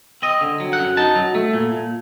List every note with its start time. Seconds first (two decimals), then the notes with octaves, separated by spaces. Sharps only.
0.22 C4 D#5
0.41 D3
0.60 F#3
0.73 F#5
0.78 F#2
0.97 D#4 A5
1.16 F#3
1.35 A3
1.53 A#2
1.72 A#2